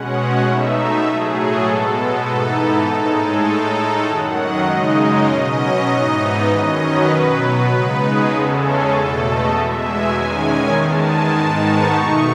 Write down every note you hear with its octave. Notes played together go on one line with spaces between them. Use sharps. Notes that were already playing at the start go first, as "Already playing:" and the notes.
Already playing: B2 G#3 C#4 F#5
F#5
B2 A3 D#4 E5
E5
A2 F#3 A3 G#4
A4
B2 G#3 B3
G#2 E3 B3 D#4 A4
A2 G#3 D#4
G#4
A2 G#3 D#4 A4
F#2 D#3 F#3 F#5
D#5
F#2 C#3 G#3 D#4
B2 F#3 C#4
D#5
G#2 E3 B3 D#4
F#2 D#3 F#3 C#4 D#5
B4
B2 F#3 B3
B4
C#3 G#3 B3 D#4
G#4
E2 C#3 G#3 C#4 A4
G#4
E2 B2 A3 A4
D#5
E2 B2 G#3 E5
G#5
E2 D#3 G#3 C#4 G#5
E2 D#3 G#3 A5
G#5
G#2 D#3 G#3 B3 D#4 A5
C#6
B2 A3 D#4